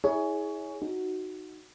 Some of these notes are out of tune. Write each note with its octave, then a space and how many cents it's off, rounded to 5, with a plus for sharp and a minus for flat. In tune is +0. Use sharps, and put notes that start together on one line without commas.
E4 -30 G#4 +0 C#5 +20
D#4 +0 F#4 +0